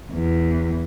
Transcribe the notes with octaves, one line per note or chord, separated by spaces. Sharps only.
E2